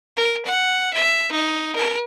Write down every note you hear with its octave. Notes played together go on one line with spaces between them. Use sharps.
A#4
F#5
E5
D#4
A#4